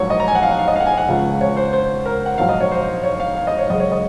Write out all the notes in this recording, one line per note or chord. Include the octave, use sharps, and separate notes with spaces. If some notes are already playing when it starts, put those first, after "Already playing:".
Already playing: A#1 G#2 F#3 C#5
D#5
A#5
G#5
F#5
F5
F#5
F5
D#5
F5 F#5
G#5
F#5
C#2 C#3 F3
C#5
C5
C5
A#4
F#5
A#1 G#2 F#3 F5
D#5
C#5
C5
C#5
F5
F5
D#5
C#5
F#2 C#3 G#3 D#5
C#5
D#5